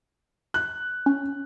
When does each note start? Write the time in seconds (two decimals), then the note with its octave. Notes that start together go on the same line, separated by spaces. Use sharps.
0.54 F#6
1.06 C#4